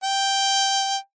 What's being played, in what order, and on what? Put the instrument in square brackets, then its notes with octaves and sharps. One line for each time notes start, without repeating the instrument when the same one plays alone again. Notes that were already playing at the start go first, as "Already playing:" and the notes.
[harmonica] G5